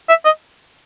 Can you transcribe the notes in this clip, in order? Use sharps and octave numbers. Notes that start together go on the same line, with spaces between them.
E5
D#5